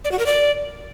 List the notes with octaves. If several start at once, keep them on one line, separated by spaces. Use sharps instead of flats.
D5
F#4
A#4
D5